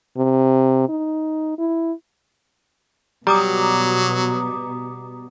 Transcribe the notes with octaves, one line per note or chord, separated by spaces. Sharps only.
C3
D#4
E4
B2 F#3 G3 A#5 D6 D#6